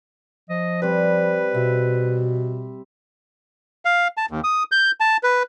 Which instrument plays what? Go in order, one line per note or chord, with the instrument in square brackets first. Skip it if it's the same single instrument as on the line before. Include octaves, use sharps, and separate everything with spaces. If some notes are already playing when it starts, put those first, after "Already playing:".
[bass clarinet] F3 [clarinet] D#5
[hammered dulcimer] G3 C4 [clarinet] B4
[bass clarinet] B2 [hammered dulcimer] E5
[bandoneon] F5
A5
D#2
D#6
G6
A5
B4